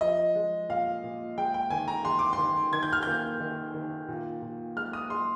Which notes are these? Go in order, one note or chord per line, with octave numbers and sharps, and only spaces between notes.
F3 D#5
G#3
A#2 F5
A#2
G#3 G5
G5
D#3 G#5
A#5
G#3 C6
D6
C6
D#3
D#3 G#6
G6
F6
A#3 G6
D#3
D#3
A#2
A#2
G#3 F6
D#6
G#3 C6